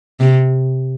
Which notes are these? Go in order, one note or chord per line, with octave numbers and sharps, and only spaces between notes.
C3